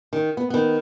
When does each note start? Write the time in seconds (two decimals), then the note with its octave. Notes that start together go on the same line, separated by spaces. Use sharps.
0.13 D#3
0.37 B3
0.50 D#3 B3